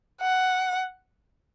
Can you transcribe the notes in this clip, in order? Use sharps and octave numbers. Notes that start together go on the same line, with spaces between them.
F#5